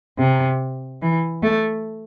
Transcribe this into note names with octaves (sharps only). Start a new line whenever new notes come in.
C3
E3
A3